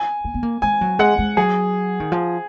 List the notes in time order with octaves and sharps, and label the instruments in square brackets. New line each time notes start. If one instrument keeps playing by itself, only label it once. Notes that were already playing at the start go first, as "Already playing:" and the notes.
Already playing: [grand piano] G#5
[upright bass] A#3
B3
A#3
[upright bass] G#3 [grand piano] G#5
[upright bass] F#3
[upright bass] G#3 [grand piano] F#5
[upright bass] G#3
[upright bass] F#3 [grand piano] G#4
[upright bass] D#3
F3